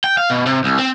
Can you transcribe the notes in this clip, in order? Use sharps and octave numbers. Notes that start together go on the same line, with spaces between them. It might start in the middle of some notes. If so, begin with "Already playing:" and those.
G5
F5
B2
C3
C2
C4